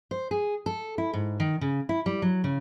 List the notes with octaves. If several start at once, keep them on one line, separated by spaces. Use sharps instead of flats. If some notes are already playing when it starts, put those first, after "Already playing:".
C5
G#4
A4
E4
G#2
D#3
C#3
E4
G3
F#3
C#3